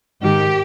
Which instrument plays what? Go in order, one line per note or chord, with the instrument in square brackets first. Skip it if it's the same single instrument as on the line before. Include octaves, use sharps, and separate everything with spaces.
[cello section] G#2 D#3 G4